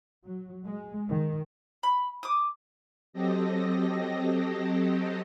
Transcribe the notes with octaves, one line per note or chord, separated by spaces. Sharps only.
F#3
G#3
D#3
B5
D6 D#6
F#3 C4 G4 A4 D#5 A#6